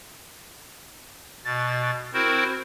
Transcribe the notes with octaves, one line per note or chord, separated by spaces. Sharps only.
B2 A6
C4 E4 F#4 A#4 C5